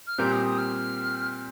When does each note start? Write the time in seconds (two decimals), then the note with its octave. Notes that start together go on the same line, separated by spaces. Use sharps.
0.07 F6
0.18 A#2 G3 C4 G4 A#4 G6
0.32 D#6
0.45 D#6
0.58 F6